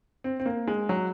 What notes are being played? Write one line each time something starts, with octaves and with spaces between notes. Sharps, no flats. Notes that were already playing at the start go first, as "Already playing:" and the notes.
C4
C4
A#3
G#3
F#3